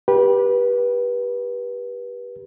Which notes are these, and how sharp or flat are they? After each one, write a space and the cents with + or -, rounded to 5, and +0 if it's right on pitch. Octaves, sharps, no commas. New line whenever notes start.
G4 +0 B4 -25